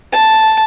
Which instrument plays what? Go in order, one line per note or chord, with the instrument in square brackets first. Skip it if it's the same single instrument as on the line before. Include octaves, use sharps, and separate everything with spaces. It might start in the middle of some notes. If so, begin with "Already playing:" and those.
[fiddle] A5